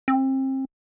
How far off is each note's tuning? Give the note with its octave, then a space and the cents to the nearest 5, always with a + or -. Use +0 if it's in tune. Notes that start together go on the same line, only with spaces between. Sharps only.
C4 +30